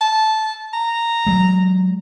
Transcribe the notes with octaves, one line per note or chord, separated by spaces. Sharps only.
A5
A#5
F#3 G#3